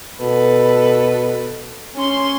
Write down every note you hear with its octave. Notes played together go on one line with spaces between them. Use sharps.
B2 A4 B4
C#4 C6